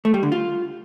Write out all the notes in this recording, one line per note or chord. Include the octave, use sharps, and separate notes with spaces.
A3
G3
D3
F4